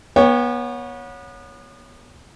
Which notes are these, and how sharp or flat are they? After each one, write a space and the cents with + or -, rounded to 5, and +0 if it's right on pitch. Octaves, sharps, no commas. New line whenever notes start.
B3 -30 C#5 +0 G5 +35